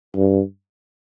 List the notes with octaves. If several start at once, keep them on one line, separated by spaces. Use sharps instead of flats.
G2